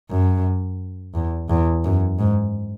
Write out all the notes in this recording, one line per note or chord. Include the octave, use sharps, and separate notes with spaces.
F#2
E2
E2
F#2
G#2